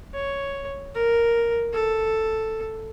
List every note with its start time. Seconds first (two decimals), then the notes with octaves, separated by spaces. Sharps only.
0.14 C#5
0.95 A#4
1.74 A4